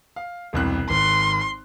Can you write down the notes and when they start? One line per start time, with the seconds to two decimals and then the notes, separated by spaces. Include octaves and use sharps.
0.16 F5
0.53 E1 C2 F#6
0.90 G#1 C6